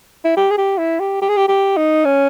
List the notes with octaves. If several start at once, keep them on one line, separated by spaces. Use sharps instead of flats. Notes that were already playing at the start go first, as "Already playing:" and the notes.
E4
G4
G#4
G4
E4
G4
G4
G#4
G4
G4
D#4
C#4